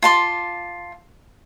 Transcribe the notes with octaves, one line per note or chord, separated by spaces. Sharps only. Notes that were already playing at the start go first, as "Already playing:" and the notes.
F4 A5 C6 D6